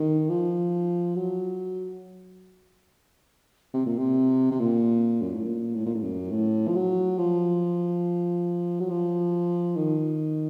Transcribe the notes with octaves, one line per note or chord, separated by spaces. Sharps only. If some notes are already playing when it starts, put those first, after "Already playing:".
Already playing: D#3
F3
F#3
C3
A#2
C3
C3
A#2
F#2
A2
A#2
A2
A#2
A2
F#2
A2
F3
F#3
F3
F#3
F3
D#3